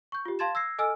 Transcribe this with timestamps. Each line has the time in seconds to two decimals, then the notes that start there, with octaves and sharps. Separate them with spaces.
0.12 C#6 G6
0.25 F4 G4
0.39 F5 A5 C6 G#6 A6 E7
0.55 E6 G#6 A#6 C7
0.79 A4 D#5 G#5 E6 F6 D7